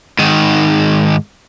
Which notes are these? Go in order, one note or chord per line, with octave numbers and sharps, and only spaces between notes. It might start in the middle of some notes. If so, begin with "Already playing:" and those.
G#2 D#3